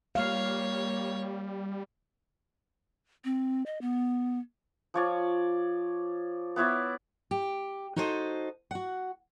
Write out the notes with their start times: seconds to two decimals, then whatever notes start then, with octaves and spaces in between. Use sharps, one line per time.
0.15 G3 A#3 C#5 F5
3.24 C4
3.66 D#5
3.81 B3
4.94 F3 C#5 D5
6.56 B3 E4 C#5 D5
7.31 G4
7.96 D#4 F#4 A4 C5 C#5 D#5
8.71 F#4 F#5